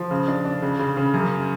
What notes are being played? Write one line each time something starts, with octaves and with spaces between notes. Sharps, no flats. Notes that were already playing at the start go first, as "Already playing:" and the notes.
Already playing: F3
C#3
D4
D4
C#3
C#3
C#3
F#2